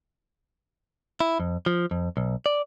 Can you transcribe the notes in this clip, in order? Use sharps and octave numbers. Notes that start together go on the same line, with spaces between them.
E4
F2
F3
F2
B1
D5